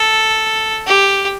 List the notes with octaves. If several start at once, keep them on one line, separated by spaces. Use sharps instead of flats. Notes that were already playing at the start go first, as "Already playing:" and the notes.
Already playing: A4
G4